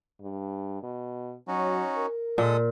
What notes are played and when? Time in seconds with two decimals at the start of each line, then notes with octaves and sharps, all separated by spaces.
0.21 G2
0.83 B2
1.48 F#3 C#4 D#4 F#4
1.97 A#4
2.38 A#2 G#3 A4 D#6